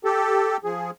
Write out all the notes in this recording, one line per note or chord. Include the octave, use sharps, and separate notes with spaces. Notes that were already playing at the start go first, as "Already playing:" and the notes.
G4 A4
F3 G#4